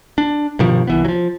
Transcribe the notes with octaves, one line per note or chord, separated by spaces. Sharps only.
D4
G2 B2 D#3 F3
C2 E3 B3
F3 F#3